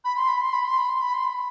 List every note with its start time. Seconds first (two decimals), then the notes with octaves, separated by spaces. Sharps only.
0.05 B5
0.16 C6
0.28 B5
0.41 C6
0.53 B5
0.65 C6
0.77 B5
0.89 C6
1.01 B5
1.14 C6
1.25 B5